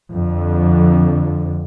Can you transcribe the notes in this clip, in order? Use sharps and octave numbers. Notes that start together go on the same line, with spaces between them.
F2 D3